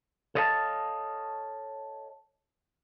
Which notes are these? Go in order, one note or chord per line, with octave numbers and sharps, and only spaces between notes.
A4 C#5 D#5 F5 F#5 A5